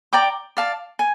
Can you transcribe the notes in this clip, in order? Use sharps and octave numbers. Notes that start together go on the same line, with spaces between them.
D5 G5 A#5 D6
D5 F5 A5
G#5